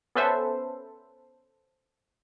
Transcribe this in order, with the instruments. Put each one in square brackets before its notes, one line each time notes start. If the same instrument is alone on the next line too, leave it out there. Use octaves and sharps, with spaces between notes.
[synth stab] B3 C#4 A4 B4 C5 E5